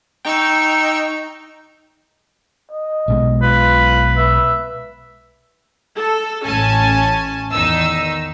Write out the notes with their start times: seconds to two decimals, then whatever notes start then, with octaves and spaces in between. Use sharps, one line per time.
0.25 D#4 G5 C#6 E6
2.71 D#5
3.08 B1 B2 G#3
3.43 F4 B4
4.17 B4 E5
5.95 A4
6.44 A1 C#4 G#5 A5
7.53 E2 D#3 D#4 E6